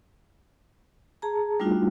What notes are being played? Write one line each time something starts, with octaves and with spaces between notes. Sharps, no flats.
G#4 A5 A#5
G3 A3 D4 D#4 F4 F#4